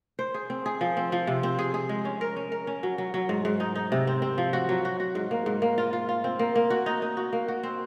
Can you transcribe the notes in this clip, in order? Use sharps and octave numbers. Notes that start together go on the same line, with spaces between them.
C5
G#4
C4
G#4
F3
C4
F3
C3
C4
G#4
G#4
G#3
C#4
A#4
C#4
A#4
C#4
F#3
F#3
F#3
G#2
G#2
D#4
D#4
C3
C4
C4
F3
F#4
F#3
F#4
F#4
G#2
A#3
G#2
A#3
F4
F4
F4
C4
A#3
A#3
F#4
D#4
D#4
F#4
A#3
F#4
C4